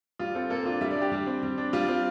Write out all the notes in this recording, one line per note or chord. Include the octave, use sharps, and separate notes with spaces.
G3 F4
C4 A4
A#3 A4
D4 F4
G3 E5
D5
D4
G4
G3
C4
G3
D4
G3 F4
C4 F4